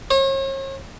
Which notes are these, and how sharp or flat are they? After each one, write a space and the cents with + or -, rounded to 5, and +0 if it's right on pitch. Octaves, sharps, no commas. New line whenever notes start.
C#5 -40